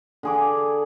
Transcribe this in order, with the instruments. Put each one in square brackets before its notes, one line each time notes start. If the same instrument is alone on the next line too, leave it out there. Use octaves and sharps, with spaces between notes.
[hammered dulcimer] D3 G#4 D6